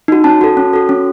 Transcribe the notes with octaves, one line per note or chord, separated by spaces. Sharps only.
D#4 F#4
C#4 A5
F#4 A4
C#4
F#4 A4
C#4